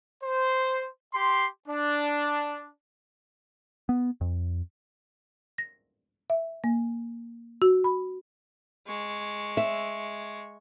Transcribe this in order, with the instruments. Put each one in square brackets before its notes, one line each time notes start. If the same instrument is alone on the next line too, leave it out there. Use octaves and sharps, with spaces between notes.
[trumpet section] C5
G4 C6
D4
[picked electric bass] B3
F2
[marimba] A#6
E5
A#3
F#4
B5
[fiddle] G#3 C#6
[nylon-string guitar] E5